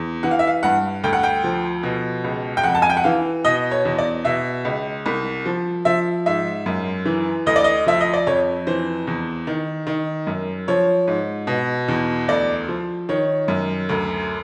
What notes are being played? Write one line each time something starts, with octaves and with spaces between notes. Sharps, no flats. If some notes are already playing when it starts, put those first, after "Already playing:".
Already playing: E2
E3 F#5
F5
E5
F5
G2 F#5
D2 G5
F#5
G5
F3
B2
C#2
G5
F2 F#5
A5
G#5
G5
F#5
E3 F5
B2 D#5
C#5
E2
D5
B2 E5
C#2
C2
F3
F3 E5
G#2 E5
F#2
E3
D2 D#5
D5
D#5
F3 E5
D#5
D5
F2 C#5
E3 C5
E2
D#3
D#3
F#2
F3 C#5
G#2
B2
E2
D2 D5
F3
D#3 C#5
F#2
D2